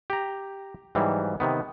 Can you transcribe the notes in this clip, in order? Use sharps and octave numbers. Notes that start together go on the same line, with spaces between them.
G4 A#5
G#2 E3 F#3 G3
C3 D#3 B3